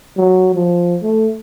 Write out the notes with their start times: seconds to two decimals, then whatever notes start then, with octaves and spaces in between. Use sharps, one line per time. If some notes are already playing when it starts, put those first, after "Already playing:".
0.17 F#3
0.55 F3
1.03 A3